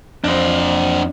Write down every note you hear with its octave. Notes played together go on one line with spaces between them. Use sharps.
F2 D4 C5